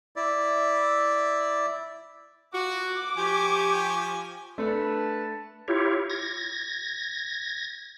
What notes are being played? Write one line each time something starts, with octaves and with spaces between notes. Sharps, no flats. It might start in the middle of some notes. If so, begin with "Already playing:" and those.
E4 D5
F4 F#4 D6
F3 G4 G#5 C#6
A3 D4 A4 B4 A5
E4 F4 G4 C#5
G#6 A#6